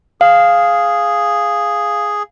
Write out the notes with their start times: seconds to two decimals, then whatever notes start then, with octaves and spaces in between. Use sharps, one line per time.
0.21 G#4 F5